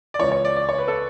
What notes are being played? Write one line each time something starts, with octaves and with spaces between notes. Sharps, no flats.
D5
C#2 C#3 E3 C#5
C#5
D5
D5
C#5
B4
A4